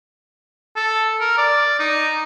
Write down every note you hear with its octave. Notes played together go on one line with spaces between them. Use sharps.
A4
A#4
D5
D#4